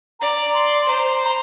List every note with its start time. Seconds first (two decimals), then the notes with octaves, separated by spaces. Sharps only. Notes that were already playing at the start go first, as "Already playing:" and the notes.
0.20 D5 A#5
0.54 C6
0.88 C5 A#5
1.22 C6
1.26 A#5